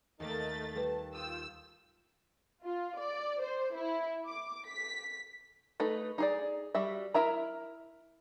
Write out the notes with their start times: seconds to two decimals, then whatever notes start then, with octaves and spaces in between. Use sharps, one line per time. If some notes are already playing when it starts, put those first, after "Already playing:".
0.20 D#2 A3 D#4 A#4 D5 D#5 A6
0.75 G3 A4 B4 A5
1.14 F4 G5 D#6 E6
2.63 F4
2.97 D5
3.41 C5
3.75 E4
4.27 D6
4.70 B6
5.80 A3 D#4 B4
6.18 D#4 G#4 D5
6.75 G3 F#4 E5
7.14 E4 A#4 E5 A#5